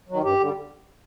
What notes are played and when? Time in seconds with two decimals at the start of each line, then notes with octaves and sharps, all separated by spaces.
0.09 D#3 F#3
0.23 G2 G4
0.40 D3 G3